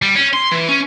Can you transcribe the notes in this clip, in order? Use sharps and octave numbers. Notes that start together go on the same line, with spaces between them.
G3
C#4
C6
E3
C#4